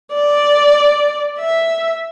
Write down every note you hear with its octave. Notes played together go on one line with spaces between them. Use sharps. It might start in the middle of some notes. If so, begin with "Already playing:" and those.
D5
E5